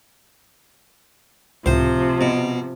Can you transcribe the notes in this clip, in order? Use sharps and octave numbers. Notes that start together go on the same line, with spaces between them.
C#2 A2 C3 F3 C5
B2